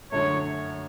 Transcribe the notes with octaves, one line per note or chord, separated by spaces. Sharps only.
F#2 D3 A3 C#5